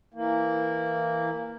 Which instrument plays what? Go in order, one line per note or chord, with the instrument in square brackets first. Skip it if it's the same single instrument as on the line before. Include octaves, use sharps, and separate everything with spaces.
[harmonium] E3 A#3